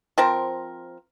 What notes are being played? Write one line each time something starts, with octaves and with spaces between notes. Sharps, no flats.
F3 C4 A#4